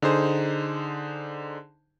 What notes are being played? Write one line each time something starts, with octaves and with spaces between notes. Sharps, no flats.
D3 D#4 G#4 C5